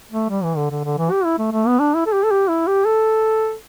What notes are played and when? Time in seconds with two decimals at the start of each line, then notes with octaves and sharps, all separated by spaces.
0.11 A3
0.29 G3
0.44 E3
0.57 D3
0.71 D3
0.85 D3
0.98 E3
1.12 G4
1.25 E4
1.39 A3
1.52 A3
1.67 B3
1.80 D4
1.95 E4
2.06 A4
2.13 G4
2.24 A4
2.31 G4
2.49 E4
2.67 G4
2.85 A4